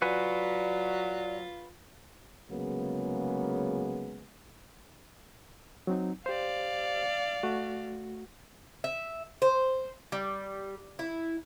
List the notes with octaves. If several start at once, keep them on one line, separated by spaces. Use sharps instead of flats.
F#3 F4 F#4 B4 D5 G#5
C2 C#3 F#3 G#3 A#3 B3
F#3 C4 D#4
G4 C5 D5 F5
A3 F#4
E5
C5
G3
E4